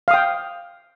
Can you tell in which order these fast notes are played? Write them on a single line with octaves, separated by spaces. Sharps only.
F5 D#6 G5